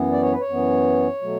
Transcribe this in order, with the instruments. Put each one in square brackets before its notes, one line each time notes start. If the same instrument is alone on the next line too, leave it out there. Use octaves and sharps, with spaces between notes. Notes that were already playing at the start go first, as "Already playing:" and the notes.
Already playing: [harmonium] F#2 E3 B3
D5
C#5
B4
C#5
F#2 E3 B3
B2 F#3 A3